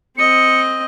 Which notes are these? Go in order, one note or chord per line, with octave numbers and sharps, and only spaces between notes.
C4 D#5 C#7